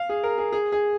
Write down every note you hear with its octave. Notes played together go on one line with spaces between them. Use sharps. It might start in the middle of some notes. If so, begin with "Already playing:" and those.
Already playing: F5
G#4
A#4
G#4
G#4
G#4